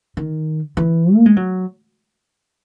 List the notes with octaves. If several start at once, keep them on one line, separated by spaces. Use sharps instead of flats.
D#3
E3
A#3
G#3
F#3